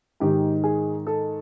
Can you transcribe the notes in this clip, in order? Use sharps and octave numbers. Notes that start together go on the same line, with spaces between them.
G#2 D#3 G4
G#4
A4